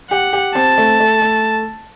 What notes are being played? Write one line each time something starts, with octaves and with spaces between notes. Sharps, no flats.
G4 F#5
G4
C4 A5
A3
A3
A3